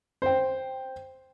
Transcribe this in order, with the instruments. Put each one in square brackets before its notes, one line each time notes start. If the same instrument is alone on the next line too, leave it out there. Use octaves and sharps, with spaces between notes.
[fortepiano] C5 G5